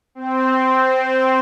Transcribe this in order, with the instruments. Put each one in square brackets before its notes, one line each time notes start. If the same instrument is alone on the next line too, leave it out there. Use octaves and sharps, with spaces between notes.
[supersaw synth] C4